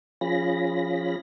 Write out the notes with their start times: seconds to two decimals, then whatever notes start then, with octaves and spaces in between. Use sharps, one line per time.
0.21 F3 C#4 F4 G#4 B5 A#6